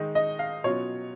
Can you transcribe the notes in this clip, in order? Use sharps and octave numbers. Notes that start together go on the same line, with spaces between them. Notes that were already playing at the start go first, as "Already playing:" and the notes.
Already playing: D#3 G#3 D#4
D#5
F5
B2 F#3 C#4 F4 C#5